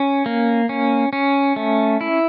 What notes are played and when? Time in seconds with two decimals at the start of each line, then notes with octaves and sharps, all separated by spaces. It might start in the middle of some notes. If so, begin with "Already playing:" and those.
Already playing: C#4
0.26 A#3
0.69 C#4
1.13 C#4
1.56 A3
2.01 E4